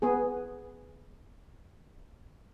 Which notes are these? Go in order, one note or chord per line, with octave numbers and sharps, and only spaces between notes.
B3 G#4